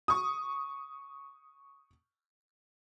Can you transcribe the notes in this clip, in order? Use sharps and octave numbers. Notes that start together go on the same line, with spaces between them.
C#6 D#6